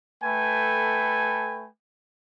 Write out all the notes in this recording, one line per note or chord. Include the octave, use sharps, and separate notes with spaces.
A3 A4 B4 G5 G#5 B5